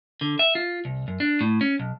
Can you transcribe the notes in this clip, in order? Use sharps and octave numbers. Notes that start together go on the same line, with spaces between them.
D3
E5
F4
C2
F#2
D4
A2
C#4
B1